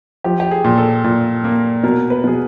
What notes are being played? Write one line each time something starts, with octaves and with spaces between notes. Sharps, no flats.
F3 G4
G4
G#4
A#2
A4
A#2
A#3
B2 A#4
B4
B2 G#4